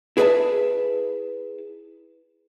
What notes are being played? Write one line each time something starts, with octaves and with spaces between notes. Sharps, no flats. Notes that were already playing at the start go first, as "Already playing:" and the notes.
E4 G#4 B4 D5 E5 A5